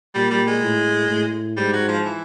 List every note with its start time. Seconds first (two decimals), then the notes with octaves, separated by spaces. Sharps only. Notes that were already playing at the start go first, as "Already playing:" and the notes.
0.15 A#2 G3
0.31 G3
0.47 G#3
0.63 A2
1.09 A2
1.57 G#2 G3
1.73 F#3
1.88 F3
2.05 E3